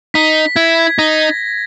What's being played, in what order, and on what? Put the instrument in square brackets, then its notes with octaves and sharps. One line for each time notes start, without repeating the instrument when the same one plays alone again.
[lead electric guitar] D#4 [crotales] B6
[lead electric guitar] E4 [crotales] G#6
[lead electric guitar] D#4 [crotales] A#6